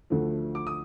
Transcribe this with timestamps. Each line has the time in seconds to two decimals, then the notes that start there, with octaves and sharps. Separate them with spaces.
0.10 D2 D3 F3 A3
0.55 D6
0.67 D#6